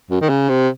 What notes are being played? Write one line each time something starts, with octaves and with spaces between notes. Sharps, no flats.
F#2
D#3
C#3
C3